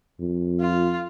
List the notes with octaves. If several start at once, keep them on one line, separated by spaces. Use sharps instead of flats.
F2
F4